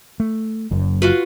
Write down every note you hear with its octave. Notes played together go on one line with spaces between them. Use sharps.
A3
F#1 F#2
F4 F#4 B4